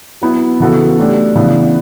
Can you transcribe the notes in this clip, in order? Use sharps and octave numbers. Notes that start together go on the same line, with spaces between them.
F#3 B3 E4
C#3 E3 B3 F#4 A4
F#3 A3 D4 G4
C#3 E3 B3 D4